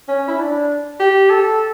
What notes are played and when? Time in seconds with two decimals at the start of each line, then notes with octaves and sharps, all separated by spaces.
0.08 C#4
0.28 E4
0.39 D4
1.00 G4
1.30 A4